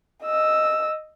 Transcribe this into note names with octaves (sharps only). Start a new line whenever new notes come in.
D#5 E6